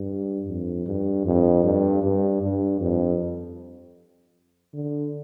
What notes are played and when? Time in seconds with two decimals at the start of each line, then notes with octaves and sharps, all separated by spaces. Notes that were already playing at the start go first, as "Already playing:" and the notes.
Already playing: G2
0.47 F2
0.86 G2
1.25 F2
1.64 G2
2.03 G2
2.42 G2
2.80 F2
4.74 D3